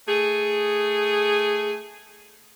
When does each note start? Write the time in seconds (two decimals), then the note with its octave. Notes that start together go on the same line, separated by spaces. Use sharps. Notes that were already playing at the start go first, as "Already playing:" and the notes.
0.08 A3 G#4